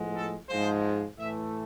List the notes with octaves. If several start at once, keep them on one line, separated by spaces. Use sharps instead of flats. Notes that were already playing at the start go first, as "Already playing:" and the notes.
Already playing: A2 F3 G#3 B3
A4
G#2 F3 G#3 C5
A2 E3 A3 E5